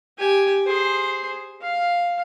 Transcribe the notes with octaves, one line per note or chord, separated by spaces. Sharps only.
G4 G#5
G#4 C5
F5